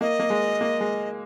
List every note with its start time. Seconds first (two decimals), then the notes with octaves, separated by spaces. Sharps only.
0.01 A#3 D#5
0.20 A#3
0.30 G#3
0.61 A#3
0.80 G#3